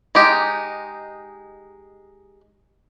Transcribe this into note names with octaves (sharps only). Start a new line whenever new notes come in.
G#3 D#4 G4